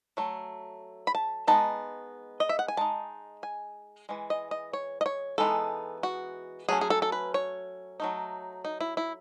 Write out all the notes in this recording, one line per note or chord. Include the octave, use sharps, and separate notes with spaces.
F#3 A3
B5
A5
G#3 B3 D#4 A5
D#5
E5
F#5
G#5
G#3 D#4 A5
G#5
E3 G#3
D#5
D#5
C#5
D#5
C#5
E3 G#3 B3 D#4 A4
F#4
F#3 A3 C#4 G#4
G#4
A4
A4
B4
C#5
F#3 A3 D#4
D#4
E4
E4